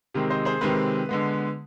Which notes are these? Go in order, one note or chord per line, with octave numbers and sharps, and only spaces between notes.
C3 D#3 G#3 C4
C5 D#5
G#4 C5
C3 D#3 G#3 C4 B4
D3 G#3 B3